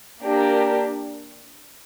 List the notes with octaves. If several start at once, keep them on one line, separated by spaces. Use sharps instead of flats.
A#3 D4 G4 A#4